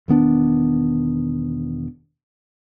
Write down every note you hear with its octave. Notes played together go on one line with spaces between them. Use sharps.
E1 D#3 B3 D4